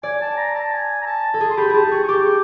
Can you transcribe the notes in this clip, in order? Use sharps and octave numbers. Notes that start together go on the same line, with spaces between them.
D5 G#5
A5
A#5
A5
G#5
A#5
A5
A4
G#4
C6
G4 B5
G4 G#4 A5
G#4 C#6
C#6
G4 D6